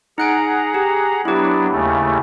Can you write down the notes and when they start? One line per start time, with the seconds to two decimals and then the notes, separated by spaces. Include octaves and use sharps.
0.18 D#4 G#4 F#5 A#5 F#6 D7
0.74 G4
1.25 F#3 B3 D4 E4 G4
1.72 D#2 C#3 A3